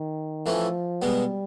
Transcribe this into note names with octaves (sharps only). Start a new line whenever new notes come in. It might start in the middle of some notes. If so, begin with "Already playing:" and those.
Already playing: D#3
A2 E3 F3 A3 C#4
B2 G3 G#3 B3